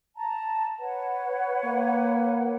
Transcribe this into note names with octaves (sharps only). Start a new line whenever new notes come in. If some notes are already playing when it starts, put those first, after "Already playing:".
A5 A#5
B4 C#5 F#5
A#3